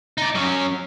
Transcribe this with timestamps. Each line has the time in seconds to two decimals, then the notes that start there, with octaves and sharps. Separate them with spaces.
0.18 D#4 D5
0.35 F#3 C#4